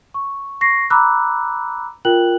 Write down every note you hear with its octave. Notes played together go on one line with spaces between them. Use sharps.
C#6
C#6 A#6 C7
A#5 B5 D6 E6 F#6
F4 A#4 G5 F#6 F#7